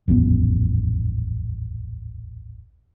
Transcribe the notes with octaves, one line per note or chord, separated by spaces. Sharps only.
D#1 A1 F2 B3